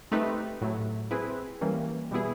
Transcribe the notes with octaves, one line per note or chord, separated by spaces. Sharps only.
A3 C4 D#4 G4 B4
A2 F#3 A3
C4 E4 G#4 B4
E3 G3 A#3 C#4
B2 G3 B3 E4 G#4